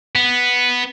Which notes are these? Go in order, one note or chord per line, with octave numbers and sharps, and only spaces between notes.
B3